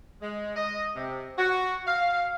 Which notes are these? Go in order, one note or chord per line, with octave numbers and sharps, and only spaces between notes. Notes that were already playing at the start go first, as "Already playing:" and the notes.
G#3
D#5
C3
F#4
F5